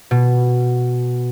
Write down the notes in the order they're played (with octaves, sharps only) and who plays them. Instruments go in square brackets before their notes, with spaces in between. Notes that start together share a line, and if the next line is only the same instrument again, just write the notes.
[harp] B2